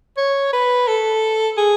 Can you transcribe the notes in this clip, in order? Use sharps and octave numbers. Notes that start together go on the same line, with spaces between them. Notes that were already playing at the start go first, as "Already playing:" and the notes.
C#5
B4
A4
G#4